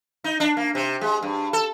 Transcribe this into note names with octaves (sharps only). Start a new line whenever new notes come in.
D#4
D4
A#3
C3
G#3
G2
A4